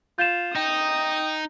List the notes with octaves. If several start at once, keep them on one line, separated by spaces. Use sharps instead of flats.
F4 G6 E7
D#4 G5 D#6